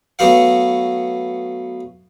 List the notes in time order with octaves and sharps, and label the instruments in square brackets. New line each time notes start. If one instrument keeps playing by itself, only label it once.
[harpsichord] F#3 A3 B3 F#4 F5 F#5